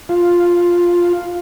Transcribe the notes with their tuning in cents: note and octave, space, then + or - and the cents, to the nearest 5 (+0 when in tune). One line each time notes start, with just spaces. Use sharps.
F4 +5